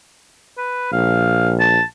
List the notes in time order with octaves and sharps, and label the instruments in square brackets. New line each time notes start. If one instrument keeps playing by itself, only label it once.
[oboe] B4
[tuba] A#1 [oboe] F5
[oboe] A5